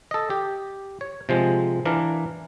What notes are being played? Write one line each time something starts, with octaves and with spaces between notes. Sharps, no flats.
A4 D#5
G4
C#5
C3 F3 G#3
E3 D4 A#4 F5